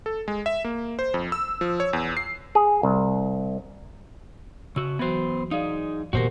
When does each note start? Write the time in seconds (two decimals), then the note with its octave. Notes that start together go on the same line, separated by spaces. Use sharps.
0.06 A4
0.28 G#3
0.46 E5
0.64 A#3
0.99 C5
1.14 F2
1.32 E6
1.61 F3
1.80 C#5
1.93 E2
2.17 C7
2.55 G#4
2.83 C2
4.76 C#3 F#4 E6
4.99 E3 F#3 B3 F#4 C5
5.51 D#4 G#4 D5 F5
6.13 F1 A#2 D#3 B3 F#4 G4 A#4 C5